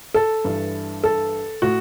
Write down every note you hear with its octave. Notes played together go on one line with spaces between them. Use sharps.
A4
G2 E3
A4
A2 F#4